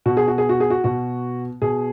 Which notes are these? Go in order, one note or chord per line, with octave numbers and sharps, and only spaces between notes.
B2 F#4
G#4
F#4
G#4
F#4
G#4
F#4
B2 F#4
B2 G#4